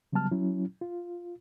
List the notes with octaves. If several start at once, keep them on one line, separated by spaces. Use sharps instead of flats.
C#3 F#3 G3 B3 A5 F6
F#3 C#4 E4
F4